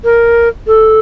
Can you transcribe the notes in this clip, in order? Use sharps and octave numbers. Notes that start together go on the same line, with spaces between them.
A#4
A4